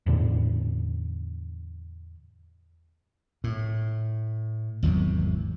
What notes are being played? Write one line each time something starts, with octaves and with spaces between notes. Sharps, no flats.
E2 A2 D3
A2
G#1 E2 C3 F#3